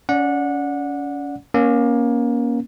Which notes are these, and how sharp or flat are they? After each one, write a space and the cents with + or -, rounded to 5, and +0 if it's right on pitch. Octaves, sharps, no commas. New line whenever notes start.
C#4 +30 D5 +0 F#5 -20
A#3 +25 C#4 +0